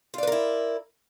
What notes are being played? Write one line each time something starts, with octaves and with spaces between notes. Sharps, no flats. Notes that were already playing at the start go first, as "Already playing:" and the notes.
E4 F4 A#4 B4 D5